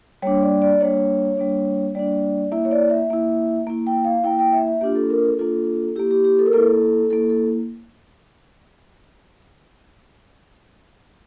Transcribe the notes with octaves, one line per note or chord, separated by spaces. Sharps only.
G3 A#3 D4 C#5
D5
D5
G3 A#3 D4 C#5
G3 A#3 D4
G3 A#3 D4 D5
A#3 E4 E5
C#5
D5
E5
A#3 E4
A#3 E4
G5
F5
A#3 E4 G5
G5
E5
E5
A#3 D4 F4 G4
A4
A#4
A4
A#3 D4 F4 A4
A#3 E4 G4
G4
G4
A4
A#4
A#3 E4 A4
A#3 E4 A4
A4